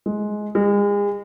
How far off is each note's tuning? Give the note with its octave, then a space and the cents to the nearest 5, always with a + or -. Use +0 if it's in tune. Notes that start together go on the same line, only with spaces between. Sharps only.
G#3 +15
G#3 -35